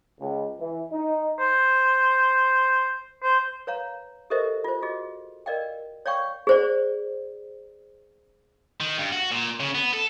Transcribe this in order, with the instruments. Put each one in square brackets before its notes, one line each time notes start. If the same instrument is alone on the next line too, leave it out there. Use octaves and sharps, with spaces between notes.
[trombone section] C#2
E3
D#4
[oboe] C5
C5
[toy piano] B4 C#5 F5 A#5
G4 A4 A#4 C5 D#5 E5
F4 C5
F#4 G#4 D#5
A#4 D5 D#5 F5 G5
C#5 D5 F5 G5 C#6
G#4 C5 D5
[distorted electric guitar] D#3
G2
F#4
A#2
C#3
B3
A4